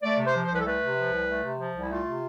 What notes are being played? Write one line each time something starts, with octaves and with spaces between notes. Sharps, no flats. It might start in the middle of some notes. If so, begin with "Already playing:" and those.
A3 D5
C3
C5
F3
C5
C2 B4
A4
A3 B4
C3
F3
C2
A3
C3
F3
C2
E4
A3 F4
C3